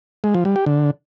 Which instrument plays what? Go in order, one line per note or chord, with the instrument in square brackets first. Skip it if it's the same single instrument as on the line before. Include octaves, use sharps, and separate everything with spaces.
[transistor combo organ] G#3
F3
G3
G4
D3